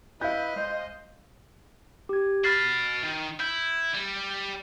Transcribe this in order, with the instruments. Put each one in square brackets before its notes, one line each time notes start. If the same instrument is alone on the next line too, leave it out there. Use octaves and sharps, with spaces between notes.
[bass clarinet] E4 [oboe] B4 [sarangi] D#5 [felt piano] F5 G6
[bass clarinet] G#3 [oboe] C5
[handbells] G4 G#6
[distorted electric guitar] F#4 B5 [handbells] F6 A6 C7
[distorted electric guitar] D#3
[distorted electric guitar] E4 [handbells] G6
[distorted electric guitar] G3